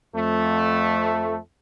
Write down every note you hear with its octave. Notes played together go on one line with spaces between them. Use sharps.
F2 A3